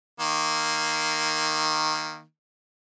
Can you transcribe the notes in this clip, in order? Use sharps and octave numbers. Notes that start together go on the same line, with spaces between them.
D#3 A#3